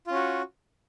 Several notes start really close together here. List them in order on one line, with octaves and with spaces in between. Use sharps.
F4 C#4 F#4